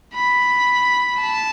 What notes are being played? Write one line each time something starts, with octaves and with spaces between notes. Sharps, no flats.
B5
A5